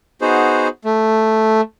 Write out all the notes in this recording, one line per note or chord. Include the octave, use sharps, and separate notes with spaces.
B3 D#4 F#4 G#4 C5
A3